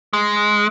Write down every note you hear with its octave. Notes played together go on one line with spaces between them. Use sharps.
G#3